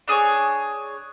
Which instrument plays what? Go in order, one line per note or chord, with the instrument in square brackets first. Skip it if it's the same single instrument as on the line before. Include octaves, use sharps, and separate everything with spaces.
[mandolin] D4 G#4 A4 C#5